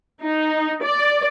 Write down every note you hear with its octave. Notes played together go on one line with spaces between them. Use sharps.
D#4
D5